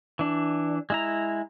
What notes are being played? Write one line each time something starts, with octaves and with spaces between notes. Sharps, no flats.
E3 D4
G#3 E4 A#5